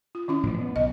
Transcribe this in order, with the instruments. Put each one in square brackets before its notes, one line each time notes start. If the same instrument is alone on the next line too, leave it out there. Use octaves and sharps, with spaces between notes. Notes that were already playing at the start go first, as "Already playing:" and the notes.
[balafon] F4
D#3 C#4 E4
[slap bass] A2 E3 F3
B3
[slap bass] B1 [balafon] D#5